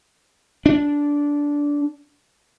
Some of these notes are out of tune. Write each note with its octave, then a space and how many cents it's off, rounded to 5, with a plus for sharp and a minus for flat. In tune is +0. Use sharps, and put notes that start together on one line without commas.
D4 -15